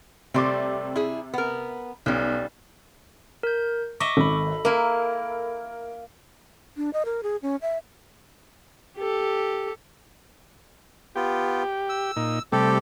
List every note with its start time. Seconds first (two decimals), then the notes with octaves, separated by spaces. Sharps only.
0.34 C3 G3 A3 C4 C6 D6
0.96 E4 G#4
1.34 B3 A#4
2.06 B1 G3 C#4
3.43 A#4 G6
4.00 D#5 E5 C#6 D6
4.17 G#1 A4 B5
4.65 A#3 E4 A#4
6.77 D4
6.93 D#5
7.05 A#4
7.23 G#4
7.42 C#4
7.62 E5
8.97 G4 A4
11.16 B3 F4 G4
11.89 E6
12.16 A#2 D#4
12.52 C3 G3 A3 G4 A4